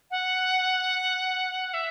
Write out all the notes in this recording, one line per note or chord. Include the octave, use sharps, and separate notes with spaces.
F#5
E5